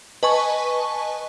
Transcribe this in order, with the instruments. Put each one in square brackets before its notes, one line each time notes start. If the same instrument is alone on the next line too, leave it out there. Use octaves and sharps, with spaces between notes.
[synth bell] B4 D#5 G#5 A5 C#6